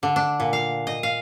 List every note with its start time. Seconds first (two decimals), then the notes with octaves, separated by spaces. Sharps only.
0.03 D3
0.16 D4
0.40 A#2
0.53 F5
0.87 D#5
1.03 F5